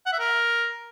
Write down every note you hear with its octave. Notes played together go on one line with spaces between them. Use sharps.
F#5
E5
A#4